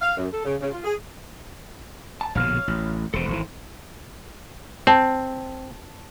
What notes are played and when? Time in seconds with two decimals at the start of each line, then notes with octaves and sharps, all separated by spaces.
0.01 F5
0.17 F#2
0.31 A4
0.44 C#3
0.60 C#3
0.71 F4
0.83 G#4
2.21 A5
2.35 A#1 B2 D3 C#5 F5 F6
2.68 A1
3.14 E1 B2 A4 C5
3.28 G#1 C3 E3
4.87 C4 A5